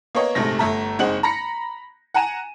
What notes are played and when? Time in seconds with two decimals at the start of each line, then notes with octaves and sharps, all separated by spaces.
0.15 A#3 B3 C#5 D#5
0.35 A#1 G#2 C3 A3 A#6
0.59 G1 A3 E5 A#5
0.99 F#1 G#3 C4 D#4 F#5 F#7
1.23 A#5 B5 A#6 C#7
2.14 F#5 G#5 A#5 D#7 E7